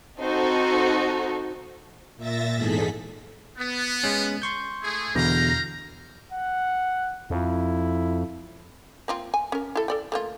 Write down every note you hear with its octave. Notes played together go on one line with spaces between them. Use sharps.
C4 D#4 F#4 A4 C5
A#2 E5 A6 A#6
E2 G#2 G#4 A4 B6
B3
G#3 C#4
C6 C#6 G6
A3 E4 G#4
E2 B2 D3 F5 G5 A#5
F#5
F2 E4
A#3 C4 F4
G#5
C#4 A#4
E4 A4
A4 D5 G5
A3 A#3 F4